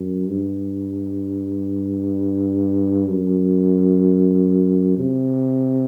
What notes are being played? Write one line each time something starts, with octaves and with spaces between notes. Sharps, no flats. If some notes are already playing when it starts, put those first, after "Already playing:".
Already playing: F#2
G2
F#2
C3